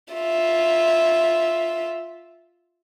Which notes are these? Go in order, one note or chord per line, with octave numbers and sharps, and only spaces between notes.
F4 E5